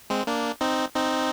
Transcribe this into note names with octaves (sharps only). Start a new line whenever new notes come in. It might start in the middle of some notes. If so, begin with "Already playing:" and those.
G#3 C4
A#3 D4
C4 D#4
C4 D#4